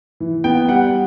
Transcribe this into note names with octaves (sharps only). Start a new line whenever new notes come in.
E3
B3 G5
G3 F#5